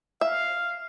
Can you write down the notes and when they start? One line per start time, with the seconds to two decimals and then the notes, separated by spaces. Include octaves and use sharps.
0.21 E5 F5